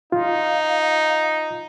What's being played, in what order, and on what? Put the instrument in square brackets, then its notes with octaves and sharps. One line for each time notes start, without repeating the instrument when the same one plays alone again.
[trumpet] D#4 [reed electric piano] F4 [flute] F5